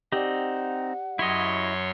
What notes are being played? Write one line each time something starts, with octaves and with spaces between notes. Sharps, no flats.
C4 D#4 G4 D5 F#5
F#2 E4 C#5 D#5 C6